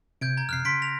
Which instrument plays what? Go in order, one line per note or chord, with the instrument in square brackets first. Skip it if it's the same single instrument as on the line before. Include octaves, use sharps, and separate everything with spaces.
[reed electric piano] C3 [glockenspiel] G6 G#6 D7
[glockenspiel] A#5 G#6
[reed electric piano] F2 C3 [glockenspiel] F6 F#6 C7
[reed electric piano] C#3 [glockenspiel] C6 B6 D7
[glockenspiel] A#6 F7